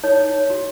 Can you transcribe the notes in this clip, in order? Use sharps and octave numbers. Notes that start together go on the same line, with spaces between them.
D#4 C#5
D#4
C#5
F#4